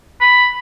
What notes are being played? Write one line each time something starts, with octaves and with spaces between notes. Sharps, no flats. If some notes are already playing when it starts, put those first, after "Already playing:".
B5